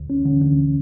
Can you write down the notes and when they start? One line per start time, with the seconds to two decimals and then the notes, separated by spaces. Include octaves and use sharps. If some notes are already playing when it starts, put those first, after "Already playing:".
Already playing: D2
0.10 C#4
0.25 D3
0.41 D2